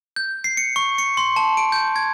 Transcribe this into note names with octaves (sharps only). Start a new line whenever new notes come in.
G6
C7
C#7
C#6
C#7
C6
A5
D7
G6
G#6